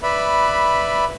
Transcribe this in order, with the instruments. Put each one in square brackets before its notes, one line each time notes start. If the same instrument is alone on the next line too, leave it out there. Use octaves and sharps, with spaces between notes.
[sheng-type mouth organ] B4 D5 E5 B5